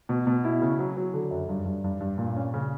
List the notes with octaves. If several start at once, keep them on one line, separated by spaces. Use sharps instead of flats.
B2
B2
E4
C#3
F#3
F#3
D3
F#2
G2
G2
G2
G2
A#2
C#4
C#3